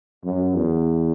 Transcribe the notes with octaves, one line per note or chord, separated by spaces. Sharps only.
F#2
E2